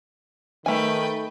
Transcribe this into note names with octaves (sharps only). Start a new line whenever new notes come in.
D#3 A3 B4 G5 G#5